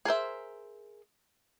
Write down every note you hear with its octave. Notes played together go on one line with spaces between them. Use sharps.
G#4 A#4 C5 E5